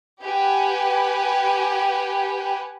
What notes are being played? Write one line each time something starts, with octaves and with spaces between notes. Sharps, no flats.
G4 B4 F#5 G#5